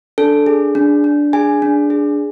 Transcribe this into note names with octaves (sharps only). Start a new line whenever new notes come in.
D4 A4
G#4
D4
D4
G#4 G#5
D4
G#4